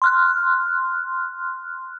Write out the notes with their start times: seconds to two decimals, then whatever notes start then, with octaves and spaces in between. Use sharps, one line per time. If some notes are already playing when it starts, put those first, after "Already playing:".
0.02 C6 F6 F#6